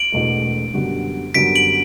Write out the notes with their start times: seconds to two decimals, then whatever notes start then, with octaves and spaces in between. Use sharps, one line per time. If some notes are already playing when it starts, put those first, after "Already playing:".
Already playing: D7 F#7
0.12 E1 E2 B2 A3
0.74 F#2 D3 G3 B3 F#4
1.34 F#2 D3 G3 B3 F#4 B6 D7
1.56 D7 F#7